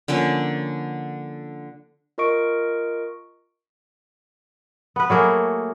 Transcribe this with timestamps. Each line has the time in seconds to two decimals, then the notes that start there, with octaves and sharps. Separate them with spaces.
0.08 D3 F3 A#3 C#4
2.18 F4 A#4 D#5 C#6 D7
4.96 B3 B4
5.10 F#3 A3 A#3 G#4